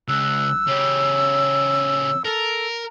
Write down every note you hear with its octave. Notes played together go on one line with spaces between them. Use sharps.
C#2 E6 F#6
F#6
C#3 G4 C#5
A4 A#4